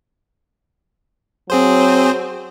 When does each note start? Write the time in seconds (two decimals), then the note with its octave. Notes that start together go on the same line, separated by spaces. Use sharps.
1.50 F#3 C4 G#4 C5